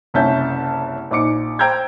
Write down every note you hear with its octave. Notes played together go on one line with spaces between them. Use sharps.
F#1 C2 C#4 E5 A5 G6
A#1 D#4 D6 C#7
C5 G5 A#5 E6 G6 G#6